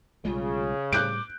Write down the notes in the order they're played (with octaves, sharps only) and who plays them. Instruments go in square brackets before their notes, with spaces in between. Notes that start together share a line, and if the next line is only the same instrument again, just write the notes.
[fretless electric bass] B1 G3 G#3 [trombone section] C#3 [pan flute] F4
[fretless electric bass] A2 G3 [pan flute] D6 [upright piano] F#6 G6 D7